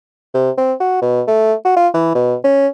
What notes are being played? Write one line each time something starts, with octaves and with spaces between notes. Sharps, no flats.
C3
C4
F#4
B2
A3
F#4
F4
E3
B2
C#4